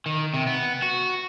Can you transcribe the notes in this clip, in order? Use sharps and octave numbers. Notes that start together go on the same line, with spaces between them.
D#3
C3
B3
F#4